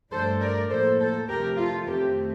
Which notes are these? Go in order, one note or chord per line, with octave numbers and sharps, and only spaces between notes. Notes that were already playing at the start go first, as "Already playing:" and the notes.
G2 F3 A3 D4 A4 C5
A#4 D5
A2 F3 A#3 A4 C5
A4 C5
D2 C3 F3 A3 G4 A#4
F4 A4
F2 D#3 A3 C4 G4 A#4